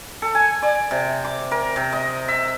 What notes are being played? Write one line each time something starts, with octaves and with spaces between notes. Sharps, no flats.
A4
G#5
D5
C3
D6
A#4
C3
D#5
E5